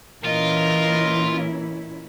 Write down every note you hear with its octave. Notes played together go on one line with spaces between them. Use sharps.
A#2 E3 C#4 E4 F4 A#4 D#5